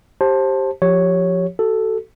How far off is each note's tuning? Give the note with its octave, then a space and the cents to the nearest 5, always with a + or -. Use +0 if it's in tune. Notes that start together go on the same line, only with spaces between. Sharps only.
G4 +0 C5 +25 A5 +0
F3 +20 G4 +0 C#5 +0
F#4 +40 A4 +5